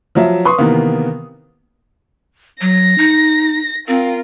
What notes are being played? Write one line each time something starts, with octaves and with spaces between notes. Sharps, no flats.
F3 F#3 E5
B4 C6 C#6 D#6
C3 D#3 E3 A#3 B3
F#3 A#6
D#4
C4 F4 A#4